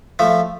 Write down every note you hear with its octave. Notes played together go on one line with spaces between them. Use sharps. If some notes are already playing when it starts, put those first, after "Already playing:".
F3 A3